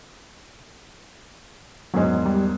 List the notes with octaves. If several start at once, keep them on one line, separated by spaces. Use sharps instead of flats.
E1 G#2 F#3 G#3
G3